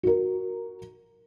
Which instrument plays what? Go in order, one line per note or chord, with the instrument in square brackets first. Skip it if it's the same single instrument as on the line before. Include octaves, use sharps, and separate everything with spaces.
[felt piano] F#4 A#4